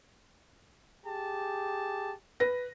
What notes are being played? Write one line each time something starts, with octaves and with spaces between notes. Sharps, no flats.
G4 G#4 A5
B4 A#6